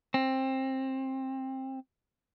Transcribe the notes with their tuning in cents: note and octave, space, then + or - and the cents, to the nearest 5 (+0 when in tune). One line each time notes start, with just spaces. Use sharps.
C4 +20